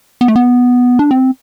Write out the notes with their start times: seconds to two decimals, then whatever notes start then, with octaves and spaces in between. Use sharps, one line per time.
0.21 B3
0.28 A3
0.36 B3
0.99 D4
1.11 C4